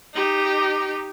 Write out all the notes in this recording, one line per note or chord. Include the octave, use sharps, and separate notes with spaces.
D#4 G4